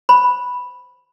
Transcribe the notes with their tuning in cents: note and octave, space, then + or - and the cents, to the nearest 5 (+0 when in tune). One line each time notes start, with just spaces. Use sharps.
C5 +0 B5 +0